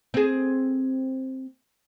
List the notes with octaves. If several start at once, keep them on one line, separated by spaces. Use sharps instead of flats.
C4 G#4